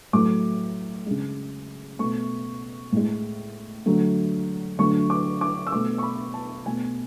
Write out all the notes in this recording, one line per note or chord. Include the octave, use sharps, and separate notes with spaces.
A2 F#3 A3 D6
C#3 G#3
B2 A3 C#6
A2 G#3
D3 F#3 A3
D3 F#3 A3 C#6
D6
D6
E6
B2 A3 D6
C#6
B5
A5
B2 A3 G#5